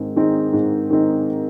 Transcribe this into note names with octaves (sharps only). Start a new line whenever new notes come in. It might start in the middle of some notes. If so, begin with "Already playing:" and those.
Already playing: G#2 D#3 G#3 C4
D#3 G#3 C4 D#4
G#2
D#3 G#3 C4 D#4